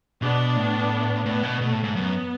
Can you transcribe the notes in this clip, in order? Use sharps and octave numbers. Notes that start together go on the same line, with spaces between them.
B2 B3 D4
A2
A2 B3
B2
B2 A3
A2
G#2
F#2 B3